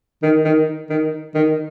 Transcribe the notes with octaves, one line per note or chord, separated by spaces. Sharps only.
D#3
D#3
D#3
D#3